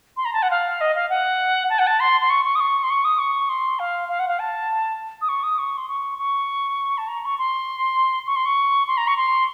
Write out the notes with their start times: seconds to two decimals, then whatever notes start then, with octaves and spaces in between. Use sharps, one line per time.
0.16 C6
0.25 A#5
0.33 A5
0.42 F#5
0.50 F5
0.80 D#5
0.95 F5
1.09 F#5
1.69 A5
1.79 F#5
1.86 A5
2.00 C6
2.20 C6
2.29 C#6
2.44 C#6
2.55 D#6
2.60 C#6
2.83 C6
2.90 C#6
3.04 D#6
3.19 C#6
3.49 C6
3.79 F5
4.09 F5
4.19 F#5
4.28 F5
4.39 A5
5.21 D#6
5.28 C#6
5.43 D#6
5.58 C#6
5.77 C6
5.88 C#6
6.18 C#6
6.97 A5
7.08 A#5
7.25 C#6
7.38 C6
8.26 C#6
8.35 C6
8.45 C#6
8.87 C6
8.97 A#5
9.07 C#6
9.17 C6